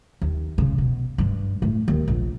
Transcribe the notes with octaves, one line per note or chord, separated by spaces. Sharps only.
D#2
C#3
B2
G2
A2
D#2
A#1